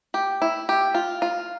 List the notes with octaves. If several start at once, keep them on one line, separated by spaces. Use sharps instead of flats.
G4
E4
G4
F4
F4